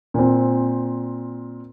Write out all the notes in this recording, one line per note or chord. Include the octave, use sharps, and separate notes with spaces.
A#2 C4